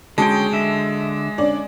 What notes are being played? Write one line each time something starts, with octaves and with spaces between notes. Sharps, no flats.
D3 G#3 C#4 F#4 G5 A5
D3 E5
C#4 D4 D5